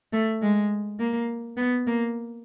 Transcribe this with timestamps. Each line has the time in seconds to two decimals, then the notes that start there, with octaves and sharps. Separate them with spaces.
0.13 A3
0.42 G#3
0.99 A#3
1.57 B3
1.86 A#3